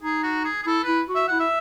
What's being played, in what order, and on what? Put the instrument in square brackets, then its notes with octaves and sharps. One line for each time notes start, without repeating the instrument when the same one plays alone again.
[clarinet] D#4 [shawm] G#4
[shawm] F#4
G#4
G#4
[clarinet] E4 [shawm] A4
[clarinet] E4 [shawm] B4
[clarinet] F#4
[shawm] E5
[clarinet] E4 [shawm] F#5
[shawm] E5